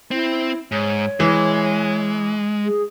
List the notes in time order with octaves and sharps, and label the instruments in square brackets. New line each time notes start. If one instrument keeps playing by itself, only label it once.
[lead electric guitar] C4 [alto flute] E4
[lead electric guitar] G#2 [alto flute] C#5
[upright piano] E3 [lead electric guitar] G#3
[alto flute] G#4